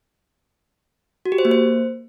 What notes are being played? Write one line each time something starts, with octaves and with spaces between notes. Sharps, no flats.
F#4
G4
C5
A#3
C5